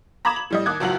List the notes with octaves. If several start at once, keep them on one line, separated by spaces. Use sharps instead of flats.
A#5 B5 D6 D#6 G#6 E7
F#7
A2 G3 D#5
D#2 D6 D#6 F#6 G#6
F#1 C#2 F#3 F#4 F#7